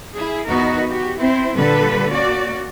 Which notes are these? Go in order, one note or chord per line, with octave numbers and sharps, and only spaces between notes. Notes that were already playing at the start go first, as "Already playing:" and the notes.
E4 G#4
E2 B3 D#4 F#4 A#4 D#5
F#4 G4
C4 E4 C5
A#2 D3 G3 A4 B4
A#3 C#4 F#4 D5